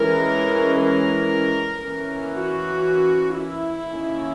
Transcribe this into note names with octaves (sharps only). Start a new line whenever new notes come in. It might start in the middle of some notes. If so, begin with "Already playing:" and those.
Already playing: E3 G#3 C#4 A#4
A#4
E3 A#3 C#4
F#4
E4
D#3 A#3 C#4